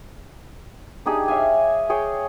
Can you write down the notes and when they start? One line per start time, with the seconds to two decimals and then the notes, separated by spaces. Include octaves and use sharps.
1.06 D4 D#4 G4 G#4
1.28 C#5 E5 F5 G#5
1.90 G#4 C#5 G5